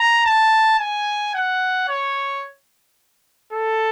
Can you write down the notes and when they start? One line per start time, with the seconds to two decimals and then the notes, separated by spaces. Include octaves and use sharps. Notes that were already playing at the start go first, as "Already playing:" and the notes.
Already playing: A#5
0.25 A5
0.79 G#5
1.34 F#5
1.88 C#5
3.52 A4